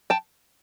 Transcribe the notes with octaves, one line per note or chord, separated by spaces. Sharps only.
G5 A5